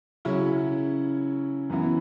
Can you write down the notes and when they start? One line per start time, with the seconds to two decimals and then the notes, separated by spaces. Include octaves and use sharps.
0.25 C#3 F#3 C#4 E4
1.70 F#2 E3 B3 E4